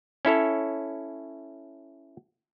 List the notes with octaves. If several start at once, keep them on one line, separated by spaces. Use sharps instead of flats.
C#4 E4 A4 C#5